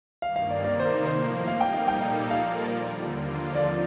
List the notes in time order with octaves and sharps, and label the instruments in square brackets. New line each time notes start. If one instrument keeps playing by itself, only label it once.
[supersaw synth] G2 D#3 A#3 [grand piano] F5
[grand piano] F5
D5
[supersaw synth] C3 D#3 A#3 D#4 [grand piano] D5
[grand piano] C5
A#4
[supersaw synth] A2 F3 A#3 [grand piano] C5
[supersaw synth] G3 A#3 D#4 [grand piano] F5
[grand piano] G5
F5
[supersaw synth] A#2 G3 A#3 D#4 A4 [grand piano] G5
[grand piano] F5
[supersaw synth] F3 A#3 F4 A#4 D5 [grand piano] F5
[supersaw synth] D#2 D3 G3
D#2 D3 F3 A#3 F4
[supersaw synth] F3 C4 D#4 [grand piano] D5